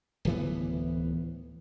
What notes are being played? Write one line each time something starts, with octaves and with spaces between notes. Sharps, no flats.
D1 E3 B3